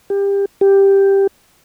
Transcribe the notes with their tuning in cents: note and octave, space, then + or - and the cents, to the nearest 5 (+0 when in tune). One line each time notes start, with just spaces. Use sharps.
G4 +25
G4 +5